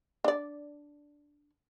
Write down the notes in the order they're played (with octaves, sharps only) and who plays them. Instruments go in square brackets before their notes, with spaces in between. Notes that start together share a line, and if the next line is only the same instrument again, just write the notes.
[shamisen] D4 D5